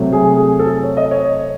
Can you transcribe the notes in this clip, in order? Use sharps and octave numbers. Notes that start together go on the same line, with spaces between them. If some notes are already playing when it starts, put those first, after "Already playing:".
Already playing: C3 F#3 A3
G#4
G#4
A4
C#5
D#5
C#5